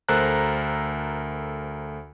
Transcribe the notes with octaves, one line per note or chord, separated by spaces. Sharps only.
D2 A4 A#4 C5 A#5 F#6